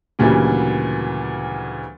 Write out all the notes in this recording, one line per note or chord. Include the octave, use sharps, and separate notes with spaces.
D2 A#2 C#3 E3 F#3 G3